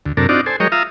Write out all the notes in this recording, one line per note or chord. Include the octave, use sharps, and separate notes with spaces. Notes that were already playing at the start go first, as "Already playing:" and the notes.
D2
F#2 C3 D4 A4 A#4
C4 D4 D#4 F4 F#4 D5
A4 C5 G#5
F#3 G#3 A#4 C#5 D#5 G5
F4 E5 F5 A#5 D#6